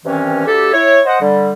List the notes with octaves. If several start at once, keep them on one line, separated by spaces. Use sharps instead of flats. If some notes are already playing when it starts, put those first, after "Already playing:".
G2 C3 D#3 E3 C4 C#4
D2 G4 A4
E4 C#5
C5 D#5 F#5
D3 G3